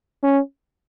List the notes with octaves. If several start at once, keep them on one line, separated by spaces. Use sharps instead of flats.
C#4